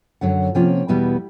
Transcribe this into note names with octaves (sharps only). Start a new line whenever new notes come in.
F#2 D3 F#3 F#5
C3 F3 A#3 C#4 F4 G5
E2 B2 G3 B3 E4